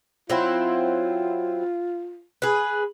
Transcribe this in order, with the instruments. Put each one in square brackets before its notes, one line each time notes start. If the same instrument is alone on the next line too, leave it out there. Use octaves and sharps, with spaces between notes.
[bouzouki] F#3 C4 E4 [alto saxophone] F4
[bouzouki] G#4 B4